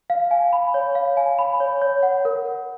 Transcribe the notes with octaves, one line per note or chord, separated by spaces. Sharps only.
F5
G#5
B5
C#5
F5
G#5
B5
C#5
C#5
F#5
A#4
A#4